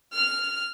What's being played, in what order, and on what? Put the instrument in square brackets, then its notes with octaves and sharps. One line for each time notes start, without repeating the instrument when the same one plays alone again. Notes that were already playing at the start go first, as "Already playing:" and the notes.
[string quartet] F6